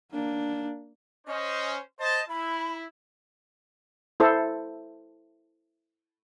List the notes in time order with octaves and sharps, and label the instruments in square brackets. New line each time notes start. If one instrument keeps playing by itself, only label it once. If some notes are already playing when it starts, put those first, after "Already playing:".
[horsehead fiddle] A#3 D4
[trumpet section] C#4 C5 [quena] D#5
[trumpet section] C5 A5 [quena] D#5
[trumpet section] E4 [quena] B5
[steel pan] E4 A4 C5